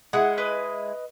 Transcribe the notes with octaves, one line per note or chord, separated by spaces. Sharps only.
G#3 E4 F#5
B4 D#5